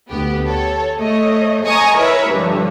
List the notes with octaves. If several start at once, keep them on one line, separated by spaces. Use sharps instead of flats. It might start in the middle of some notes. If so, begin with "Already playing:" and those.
D2 B3 G4
A4 C#5
A3 C#5 D#5
D#5 G#5 A#5 C#6 D#6
E4 A#4 B4 C#5 E5
G2 D3 F3